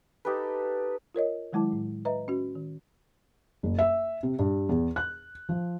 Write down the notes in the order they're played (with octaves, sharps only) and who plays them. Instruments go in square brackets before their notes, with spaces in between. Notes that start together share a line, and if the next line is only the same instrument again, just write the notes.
[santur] D#4 G4 A4 B4
[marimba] F4 A#4 C#5 D#5
D#3 F#3 G#3 E4 A5 D6
A2
B4 D#5 E5 A#5
C#4 F#4
D#3
[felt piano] F#1
E5
C3
G2
E2
F#6
F3